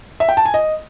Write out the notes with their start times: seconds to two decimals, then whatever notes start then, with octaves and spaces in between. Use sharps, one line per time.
0.20 E5
0.29 G5
0.37 A5
0.45 G#5
0.54 D#5